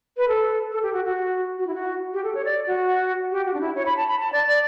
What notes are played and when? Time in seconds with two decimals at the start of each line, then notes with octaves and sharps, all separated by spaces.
0.17 B4
0.28 A4
0.71 A4
0.83 G4
0.93 F#4
1.05 F#4
1.58 F#4
1.67 E4
1.74 F#4
2.13 G4
2.24 A4
2.35 C#5
2.45 D5
2.67 F#4
3.32 G4
3.46 F#4
3.54 D4
3.61 E4
3.75 C#5
3.86 B5
3.97 A5
4.08 B5
4.19 A5
4.33 D5
4.48 D5